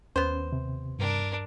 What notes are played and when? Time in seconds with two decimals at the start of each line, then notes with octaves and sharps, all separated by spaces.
0.16 D#2 B3 C#4 C5
0.52 C3
0.99 G2 D4 A#4